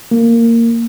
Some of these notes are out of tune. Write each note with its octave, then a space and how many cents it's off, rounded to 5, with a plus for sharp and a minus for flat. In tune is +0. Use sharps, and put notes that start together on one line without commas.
A#3 -15